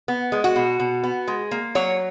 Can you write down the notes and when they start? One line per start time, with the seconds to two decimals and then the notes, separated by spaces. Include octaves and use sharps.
0.08 B3
0.32 G#3
0.44 F#4
0.56 B2
0.80 B2
1.03 B3
1.27 G#3
1.51 A#3
1.75 F#3 C#5